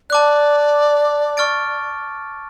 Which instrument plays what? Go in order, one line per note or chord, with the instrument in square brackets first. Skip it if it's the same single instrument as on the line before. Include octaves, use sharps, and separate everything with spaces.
[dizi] D5 [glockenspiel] A5 D6 F#6
[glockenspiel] C#6 F6 A6 D7